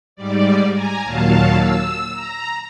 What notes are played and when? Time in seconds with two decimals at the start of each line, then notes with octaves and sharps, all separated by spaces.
0.16 G#2 G3 D5
0.72 G#5 A#5
1.05 D#2 A#2 F#3 F5 A5
1.57 E6
2.12 A#5